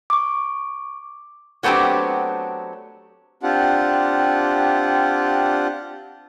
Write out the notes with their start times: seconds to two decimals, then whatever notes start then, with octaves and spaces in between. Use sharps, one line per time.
0.10 C#6 D6
1.63 F#3 A3 B3 C4 D4 G4
3.43 C4 D4 F4 G4 F#5